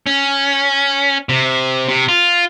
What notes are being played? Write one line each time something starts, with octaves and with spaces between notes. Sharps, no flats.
C#4
C3
C3
F4